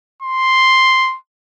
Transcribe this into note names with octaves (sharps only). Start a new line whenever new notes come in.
C6